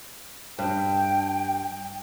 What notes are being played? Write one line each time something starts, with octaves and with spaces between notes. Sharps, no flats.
G2 G5